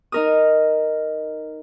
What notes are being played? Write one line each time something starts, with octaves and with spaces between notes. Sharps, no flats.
D#4 A#4 D#6